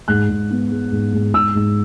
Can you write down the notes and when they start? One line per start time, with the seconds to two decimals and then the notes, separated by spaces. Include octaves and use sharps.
0.08 G#2 F#6
0.29 G#2
0.50 B3
0.71 G#3
0.92 G#2
1.13 G#2
1.34 G#2 E6
1.55 G#2